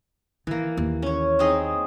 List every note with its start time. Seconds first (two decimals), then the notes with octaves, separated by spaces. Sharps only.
0.47 D#3 E3 A#3
0.77 D#2
1.02 C#4 C#5
1.39 C4 D#4 G#4